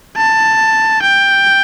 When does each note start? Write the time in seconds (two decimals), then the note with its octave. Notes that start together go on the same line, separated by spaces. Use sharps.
0.17 A5
1.02 G5